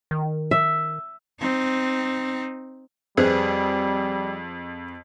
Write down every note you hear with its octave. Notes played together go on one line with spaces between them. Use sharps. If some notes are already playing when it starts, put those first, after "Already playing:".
D#3
E5
C4 D#4
F2 G3 G#4 B4 C5